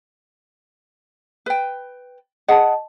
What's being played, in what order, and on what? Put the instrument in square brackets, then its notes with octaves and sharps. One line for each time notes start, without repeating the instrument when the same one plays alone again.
[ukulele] B4 G5
[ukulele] G#4 F#5 [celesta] D#5 A5